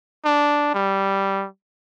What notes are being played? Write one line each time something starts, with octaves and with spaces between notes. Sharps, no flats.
D4
G3